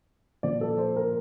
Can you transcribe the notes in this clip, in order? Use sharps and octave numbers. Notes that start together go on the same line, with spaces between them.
A#2 F3 D5
A4
C5
A#4